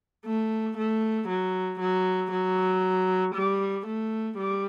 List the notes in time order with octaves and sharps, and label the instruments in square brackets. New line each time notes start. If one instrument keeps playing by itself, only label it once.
[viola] A3
A3
F#3
F#3
F#3
G3
A3
G3